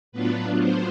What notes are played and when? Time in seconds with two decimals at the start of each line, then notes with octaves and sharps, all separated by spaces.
0.12 A2 F#3 B3 D4 F4 B4
0.61 C5